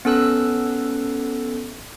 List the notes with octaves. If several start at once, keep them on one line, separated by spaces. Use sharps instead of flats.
B3 C#4 A4 E6 F#6